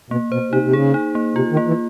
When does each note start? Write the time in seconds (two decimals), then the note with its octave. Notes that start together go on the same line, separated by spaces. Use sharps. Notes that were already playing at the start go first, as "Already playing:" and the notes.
0.10 B2 A#3
0.32 B2 C5
0.52 C3 D#4
0.63 C3
0.73 C#3 G#4
0.94 D#4
1.15 A#3
1.36 C3 F4
1.52 D#3
1.57 A#3
1.67 E3